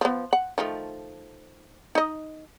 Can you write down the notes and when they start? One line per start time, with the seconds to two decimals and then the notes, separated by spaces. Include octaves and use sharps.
0.01 F3 B3
0.33 F#5
0.58 D#3 F3 A3
1.95 D#4 D#5